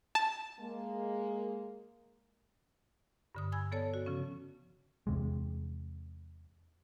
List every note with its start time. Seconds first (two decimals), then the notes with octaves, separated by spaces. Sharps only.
0.15 A5
0.60 G#3 A#3
3.35 G2 D3 D#6
3.52 G#5 B5 E6 G#6
3.72 B3 A4 C#5 D5 A5
3.94 F#4
4.06 C#3 F3 C#4
5.07 E2 C3 G#3